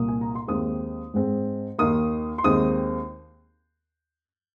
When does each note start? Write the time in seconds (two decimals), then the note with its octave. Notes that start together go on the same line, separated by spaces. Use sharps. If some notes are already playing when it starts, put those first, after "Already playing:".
Already playing: C2 A#2 A#3 D#6
0.08 G#5
0.21 A#5
0.35 C6
0.48 D#2 D#3 G#3 C4 D#6
1.14 G#2 G#3 C4
1.79 D#2 D#3 A#3 D#6
2.38 C6
2.44 D#2 D#3 G#3 C4 D#6